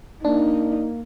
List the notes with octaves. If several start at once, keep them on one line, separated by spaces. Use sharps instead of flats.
A#3 D4 D#4